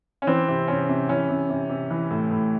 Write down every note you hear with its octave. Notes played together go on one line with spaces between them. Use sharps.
C#4
E3 C4
C3
C3 C#4
C3
E3 C#4
C3
C3
C3
E3
A2
A2